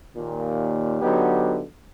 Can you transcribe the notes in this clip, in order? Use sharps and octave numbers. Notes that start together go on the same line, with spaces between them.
D#2 A#2
D3 F#3 B3 D#4 G4